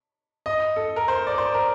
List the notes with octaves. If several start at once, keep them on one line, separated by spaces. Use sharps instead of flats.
D#5
A4
A#4
C5
D5
C5
A#4